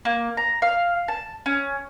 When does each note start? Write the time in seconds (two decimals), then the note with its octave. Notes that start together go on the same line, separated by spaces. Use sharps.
0.05 A#3
0.37 A#5
0.62 F5
1.08 A5
1.46 C#4